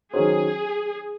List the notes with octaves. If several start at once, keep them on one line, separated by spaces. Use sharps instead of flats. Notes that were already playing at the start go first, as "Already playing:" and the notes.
D#3 F#3 C#4 F#4 G#4 C5